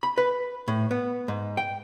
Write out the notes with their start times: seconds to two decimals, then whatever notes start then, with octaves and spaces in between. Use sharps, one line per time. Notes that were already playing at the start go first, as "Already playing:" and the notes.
0.03 B5
0.18 B4
0.68 A2
0.91 B3
1.28 G#2
1.57 G5